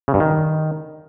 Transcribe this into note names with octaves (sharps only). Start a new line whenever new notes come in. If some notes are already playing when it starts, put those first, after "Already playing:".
C#3
G2
D#3